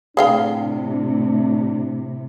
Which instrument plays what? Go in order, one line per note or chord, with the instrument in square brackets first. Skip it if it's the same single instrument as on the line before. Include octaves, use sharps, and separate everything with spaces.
[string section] A2 C3 [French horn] D4 [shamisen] G#4 F5 G5